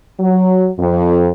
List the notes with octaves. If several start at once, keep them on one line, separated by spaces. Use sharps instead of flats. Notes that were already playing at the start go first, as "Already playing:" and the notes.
F#3
F2